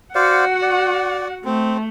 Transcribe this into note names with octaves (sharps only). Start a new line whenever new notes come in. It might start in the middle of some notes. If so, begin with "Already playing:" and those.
F#4 C5 D5 F5 F#5
D5
A3 C4